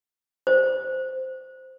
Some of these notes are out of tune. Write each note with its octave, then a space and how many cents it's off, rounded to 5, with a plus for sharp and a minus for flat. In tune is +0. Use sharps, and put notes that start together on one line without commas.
C5 -5